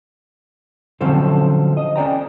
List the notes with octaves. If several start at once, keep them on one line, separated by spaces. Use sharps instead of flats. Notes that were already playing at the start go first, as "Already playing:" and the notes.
D3 F3 F#3 C4 C#4 A4
D#5
C#4 D5 G5 A#5